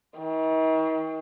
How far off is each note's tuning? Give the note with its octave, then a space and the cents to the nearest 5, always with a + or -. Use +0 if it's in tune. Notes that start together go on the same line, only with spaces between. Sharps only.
D#3 +45